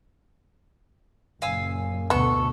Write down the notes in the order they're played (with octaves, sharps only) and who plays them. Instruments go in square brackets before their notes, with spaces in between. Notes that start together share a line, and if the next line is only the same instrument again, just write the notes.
[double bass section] F#1 A#2 [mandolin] F5 G#5 E6
[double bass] D2 B2 [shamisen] B3 [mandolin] A4 C#6